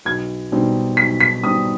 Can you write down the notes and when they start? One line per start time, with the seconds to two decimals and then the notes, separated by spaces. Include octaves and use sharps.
0.05 B1 G#6
0.52 B2 G3 C4 D#4
0.97 B1 B6
1.20 B6
1.43 B2 G3 C4 D#4 D#6